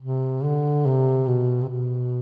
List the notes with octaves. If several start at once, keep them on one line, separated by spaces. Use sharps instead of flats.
C3
D3
C3
B2
C3
B2